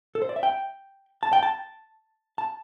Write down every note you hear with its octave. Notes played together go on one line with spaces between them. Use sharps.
A4
C5
D5
E5
G5
A5
G5
A5
A5